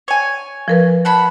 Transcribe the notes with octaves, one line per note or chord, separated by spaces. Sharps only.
C#5 G#5
F3 A#4 B4
F#5 A5 B5